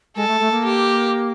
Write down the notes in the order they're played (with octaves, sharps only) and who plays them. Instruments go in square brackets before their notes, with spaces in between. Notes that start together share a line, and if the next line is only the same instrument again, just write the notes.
[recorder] G#3 [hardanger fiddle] A4
[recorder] A3
A3
A#3
[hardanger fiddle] G4